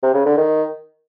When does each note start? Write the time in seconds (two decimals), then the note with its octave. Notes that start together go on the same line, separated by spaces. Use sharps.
0.03 C3
0.14 C#3
0.26 D3
0.37 D#3